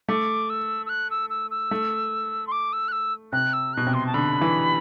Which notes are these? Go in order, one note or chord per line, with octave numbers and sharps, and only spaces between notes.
A3 D6
E6
E6
F#6
E6
E6
E6
A3
C6
D6
E6
F#6
E6
C3 F#6
E6
B2 F#6
C3
C6
A5
D3 B5
E3